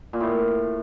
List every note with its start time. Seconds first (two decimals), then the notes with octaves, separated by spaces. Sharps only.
0.13 A#2
0.20 A2